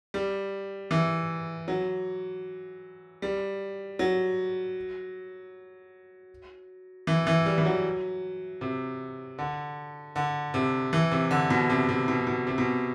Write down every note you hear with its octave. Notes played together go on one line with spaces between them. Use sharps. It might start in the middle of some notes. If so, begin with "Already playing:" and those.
G3
E3
F#3
G3
F#3
E3
E3
G3
E3
F#3
C3
D3
D3
C3
E3
C3
D3
B2
C3
C3
B2
B2
C3
B2